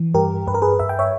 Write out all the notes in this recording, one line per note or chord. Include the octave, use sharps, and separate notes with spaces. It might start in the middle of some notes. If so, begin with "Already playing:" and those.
Already playing: E3
G2 G4 A#4
G2 B4
A#4
G#4 B4
G2 E5
G5
C#5 E5